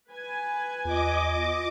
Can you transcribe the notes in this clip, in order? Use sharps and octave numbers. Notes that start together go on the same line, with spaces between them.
B4 G#5
E2 F4 D#5 D6